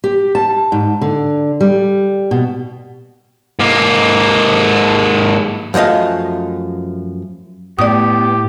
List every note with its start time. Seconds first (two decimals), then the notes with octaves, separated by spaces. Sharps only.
0.04 G4
0.35 A5
0.72 G#2
1.02 D3
1.61 G3
2.31 B2
3.59 G#2 A#3
5.74 F#2 F3 A3 D#5 F5
7.79 A2 B3 G4 D5 D#6